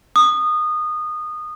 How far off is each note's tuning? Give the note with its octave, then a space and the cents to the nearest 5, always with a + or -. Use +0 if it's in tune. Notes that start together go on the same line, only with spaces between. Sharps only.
D#6 -20